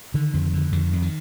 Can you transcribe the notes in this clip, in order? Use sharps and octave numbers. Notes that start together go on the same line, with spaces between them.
D3 D#3
F2
D3
F2 D#3
F2
D#3